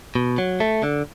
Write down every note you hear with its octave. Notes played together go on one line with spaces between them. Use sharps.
B2
F#3
A3
D3